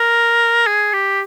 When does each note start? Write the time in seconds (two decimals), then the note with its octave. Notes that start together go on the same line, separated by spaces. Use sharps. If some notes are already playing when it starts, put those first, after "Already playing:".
Already playing: A#4
0.67 G#4
0.93 G4